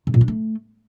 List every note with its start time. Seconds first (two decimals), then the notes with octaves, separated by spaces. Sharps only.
0.07 C3
0.14 A#2
0.21 D4
0.28 A3